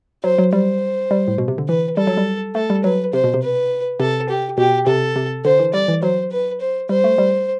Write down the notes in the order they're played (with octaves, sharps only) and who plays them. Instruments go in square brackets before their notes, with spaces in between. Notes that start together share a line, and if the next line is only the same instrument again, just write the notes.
[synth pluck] F#3 [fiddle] C5
[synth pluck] F#3
[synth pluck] G3 [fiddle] C5
[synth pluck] G3
A2
B2
C3
D3
[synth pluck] E3 [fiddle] B4
[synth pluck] G3 [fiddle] A4
[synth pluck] F#3
G3
[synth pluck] A3 [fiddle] A4
[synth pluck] G3
[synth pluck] F#3 [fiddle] B4
[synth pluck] C3 [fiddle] C5
[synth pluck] B2
C3
[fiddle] B4
[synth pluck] C3 [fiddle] A4
[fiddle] G4
[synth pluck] B2 [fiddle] G4
[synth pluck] C3 [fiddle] A4
[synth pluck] C3
[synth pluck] D3 [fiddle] C5
[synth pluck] E3
[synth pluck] G3 [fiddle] D5
[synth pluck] E3
[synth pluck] F#3 [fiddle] C5
[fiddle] B4
C5
[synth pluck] G3 [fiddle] C5
[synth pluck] A3
G3